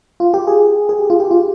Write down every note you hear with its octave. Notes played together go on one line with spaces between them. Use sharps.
F4
G4
G#4
G#4
G4
F4
G4
F4